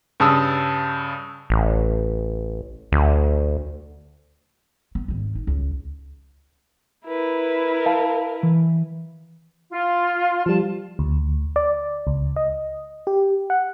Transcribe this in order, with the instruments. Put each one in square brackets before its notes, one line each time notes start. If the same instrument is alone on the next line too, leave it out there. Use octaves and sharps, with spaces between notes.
[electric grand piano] G2 C#3 A5 D#6 E6
[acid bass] A1
D2
[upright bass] B3
G#1 D#3
D#4
C#2
[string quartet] E4 A#4 B4
[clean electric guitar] F5 A5
E3
[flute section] F4
[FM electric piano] F3 G3 [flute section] A5
[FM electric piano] D2
D5
C#2
D#5
G4
F#5